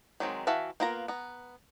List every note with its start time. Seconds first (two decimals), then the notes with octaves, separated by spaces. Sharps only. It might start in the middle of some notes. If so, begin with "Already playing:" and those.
0.20 D#3 F#3 G#3 C4
0.47 E3 F#4 E5 F5 A5
0.80 A#3 B3 F4 A#4 A#5
1.08 B3 A#5